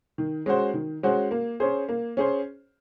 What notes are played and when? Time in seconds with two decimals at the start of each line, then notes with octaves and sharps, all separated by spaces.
0.18 D#3
0.46 G#3 C#4 F#4 C5
0.74 D#3
1.03 G#3 C#4 F#4 C5
1.31 A#3
1.60 C#4 G#4 C5
1.89 A#3
2.17 C#4 G#4 C5